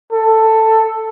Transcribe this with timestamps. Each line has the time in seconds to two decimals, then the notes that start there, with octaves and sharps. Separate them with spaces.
0.13 A4